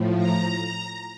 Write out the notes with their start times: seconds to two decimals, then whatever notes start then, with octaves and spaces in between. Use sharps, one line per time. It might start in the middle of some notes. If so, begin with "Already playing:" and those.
Already playing: A2 F3
0.17 A#5